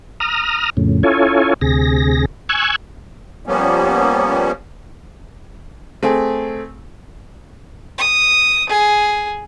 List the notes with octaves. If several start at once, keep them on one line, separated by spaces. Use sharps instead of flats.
A#5 D#6 F6
F2 A2 C#3
C#4 E4 F4 A4 C#5 G#5
D2 C3 G#4 A#6
G#5 C#6 E6 F#6 G#6
F3 G3 A#3 B3 C#4
A3 C4 G#4
D#6
G#4